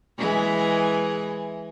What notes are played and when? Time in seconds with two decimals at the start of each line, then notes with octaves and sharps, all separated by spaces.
0.18 E3 G#3 G#4